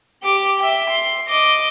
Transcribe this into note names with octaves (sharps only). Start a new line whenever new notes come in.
G4 D6
E5 G5
C6
D#5 D6